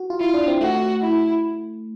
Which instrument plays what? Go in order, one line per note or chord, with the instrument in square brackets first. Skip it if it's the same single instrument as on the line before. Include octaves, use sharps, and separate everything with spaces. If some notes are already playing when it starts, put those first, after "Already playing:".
Already playing: [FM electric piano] F#4
F4
[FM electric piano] E4 [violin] F4
[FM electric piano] D4
C4
[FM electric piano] A3 [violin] F#4
[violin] E4